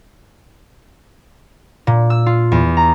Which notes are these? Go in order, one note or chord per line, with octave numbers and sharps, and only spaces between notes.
A#2
E6
F4
E2
A#5